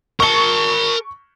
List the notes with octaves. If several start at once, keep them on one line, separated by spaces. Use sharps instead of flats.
A#4 A5 C#6 G7